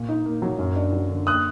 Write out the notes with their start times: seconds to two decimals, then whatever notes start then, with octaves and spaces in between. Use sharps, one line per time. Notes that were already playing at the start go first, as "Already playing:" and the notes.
Already playing: A#2
0.09 D#4
0.26 A#3
0.42 F#3
0.59 F#2
0.76 D4
0.93 F#3
1.09 D3
1.27 D#6 F#6